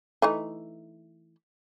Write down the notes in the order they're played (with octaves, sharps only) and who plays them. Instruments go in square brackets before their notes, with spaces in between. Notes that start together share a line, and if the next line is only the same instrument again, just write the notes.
[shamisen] E3 A3 D#4